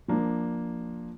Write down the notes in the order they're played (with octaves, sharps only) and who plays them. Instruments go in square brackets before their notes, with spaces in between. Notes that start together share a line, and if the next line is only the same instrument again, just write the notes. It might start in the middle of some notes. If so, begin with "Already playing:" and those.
[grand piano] F3 A#3 D4